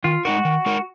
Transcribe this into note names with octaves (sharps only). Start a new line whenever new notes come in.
D#3 F4
G#3 D#4 F#4 A#4
D#3
G#3 D#4 A#4